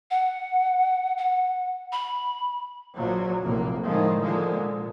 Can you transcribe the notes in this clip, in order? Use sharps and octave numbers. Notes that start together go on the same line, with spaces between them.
F#5
F#5
B5
A#1 F3 F#3
F1 A#1 A2 A#3
A2 D3 D#3 F3 G#3
D3 F3 G#3 A#3
A#2